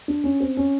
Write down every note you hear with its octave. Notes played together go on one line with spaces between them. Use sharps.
D4
C#4
C4
C#4